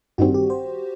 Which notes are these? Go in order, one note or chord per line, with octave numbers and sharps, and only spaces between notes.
A1 G2 D#3 G3 C4 F#4
G4
C5